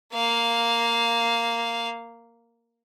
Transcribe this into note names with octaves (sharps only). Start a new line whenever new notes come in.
A#3 F5